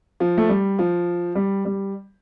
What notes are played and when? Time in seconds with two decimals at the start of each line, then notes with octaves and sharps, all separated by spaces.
0.20 F3
0.38 A3
0.49 G3
0.79 F3
1.35 G3
1.65 G3